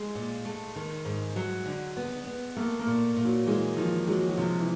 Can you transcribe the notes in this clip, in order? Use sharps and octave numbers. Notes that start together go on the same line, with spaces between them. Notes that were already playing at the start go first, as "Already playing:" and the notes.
Already playing: G#3
A#2
A3
D#3
G#2
F#3
D3
B3
B3
A3 A#3
A#3
A#2
A#2
F#3
E3 G#3
D#3 F3
F#3 G#3
F#3
C3 F3
E3